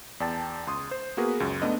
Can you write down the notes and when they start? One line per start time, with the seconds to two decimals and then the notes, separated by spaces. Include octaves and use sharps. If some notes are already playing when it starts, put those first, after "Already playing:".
0.20 E2 D5 G5 A5 A6
0.67 C#2 C6 D#6
0.91 C5
1.17 A#3 B3 F#4 G#4 A#4 B4
1.40 C#2 F#2
1.62 A3 B3 D4 D#5